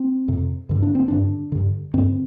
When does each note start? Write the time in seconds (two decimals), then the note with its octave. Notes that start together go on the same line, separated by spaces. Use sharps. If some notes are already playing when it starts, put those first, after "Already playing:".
Already playing: C4
0.28 F2 C3
0.69 G2 D3
0.82 D4
0.95 C4
1.08 G2 D3 D4
1.52 G2 D3
1.94 G2 D3 C4